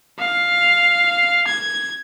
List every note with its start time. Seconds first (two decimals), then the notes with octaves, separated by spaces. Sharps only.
0.19 F5
1.47 G#6